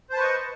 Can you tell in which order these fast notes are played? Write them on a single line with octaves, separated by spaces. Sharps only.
C5 A5 B4 C#6 D#5